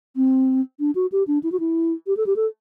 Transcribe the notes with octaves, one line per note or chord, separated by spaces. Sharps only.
C4
D4
F#4
G4
D4
E4
F#4
E4
G4
A4
G4
A4